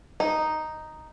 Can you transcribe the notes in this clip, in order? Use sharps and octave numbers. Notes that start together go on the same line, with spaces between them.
D#4